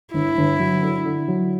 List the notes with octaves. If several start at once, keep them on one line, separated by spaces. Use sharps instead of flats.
G1 E4
G1
F#3
D3
D3
F#3